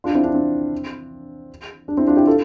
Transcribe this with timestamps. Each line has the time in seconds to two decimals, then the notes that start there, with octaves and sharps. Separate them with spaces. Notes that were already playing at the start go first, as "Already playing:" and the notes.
0.04 D4 F4
0.14 C4 E4
0.23 D4
0.34 C4
1.88 D4
1.97 C4 E4
2.07 D4 F4
2.17 E4 G4
2.27 F4 A4